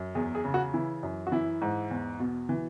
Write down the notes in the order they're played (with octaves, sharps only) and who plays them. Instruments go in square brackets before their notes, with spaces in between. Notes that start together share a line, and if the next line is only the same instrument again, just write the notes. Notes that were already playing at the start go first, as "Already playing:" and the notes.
Already playing: [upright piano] F#2
E2 G#4
G#4
C#3
F#4
E3 E4
F#2
F#4
E3 E4
G#2
E2
B2
E3